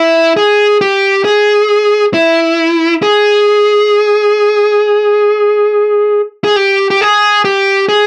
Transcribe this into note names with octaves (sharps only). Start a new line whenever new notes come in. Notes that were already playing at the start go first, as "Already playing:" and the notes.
Already playing: E4
G#4
G4
G#4
E4
G#4
G#4
G4
G4
G#4
G4
G#4